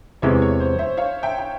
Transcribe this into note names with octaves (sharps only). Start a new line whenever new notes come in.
E2 C3 E3 G#3 C#4 C#5
C#5
C5
C5 E5
C#5 F5
E5 G5
G5